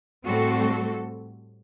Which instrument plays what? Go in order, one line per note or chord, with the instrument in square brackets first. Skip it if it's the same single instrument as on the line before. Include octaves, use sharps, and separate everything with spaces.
[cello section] A2 G3 C4 F#4 A4